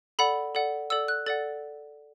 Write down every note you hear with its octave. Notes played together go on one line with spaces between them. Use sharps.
A4 D5 F#5 B5
A4 D5 F#5
A4 D5 F#5 E6
F#6
A4 D5 F#5 A6